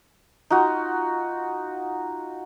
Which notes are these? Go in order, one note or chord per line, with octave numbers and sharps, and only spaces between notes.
D#4 F4 F#4